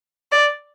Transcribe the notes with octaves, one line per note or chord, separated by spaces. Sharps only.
D5